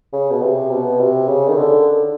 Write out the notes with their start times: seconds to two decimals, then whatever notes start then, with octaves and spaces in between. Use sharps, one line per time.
0.13 C#3
0.31 B2
0.42 C3
0.71 B2
1.00 C3
1.28 C#3
1.49 D#3
1.57 D3